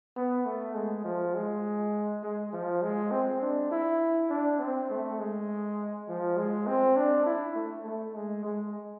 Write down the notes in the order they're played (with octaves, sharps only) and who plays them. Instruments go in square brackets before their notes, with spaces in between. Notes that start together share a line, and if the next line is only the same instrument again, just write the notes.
[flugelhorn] B3
A3
G#3
F3
G#3
G#3
F3
G#3
C4
D4
E4
D4
C4
A3
G#3
F3
G#3
C4
D4
E4
A3
A3
G#3
G#3